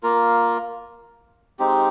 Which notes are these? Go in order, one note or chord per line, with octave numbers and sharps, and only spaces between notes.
A#3 F4 A#4
G#3 C4 D#4 G4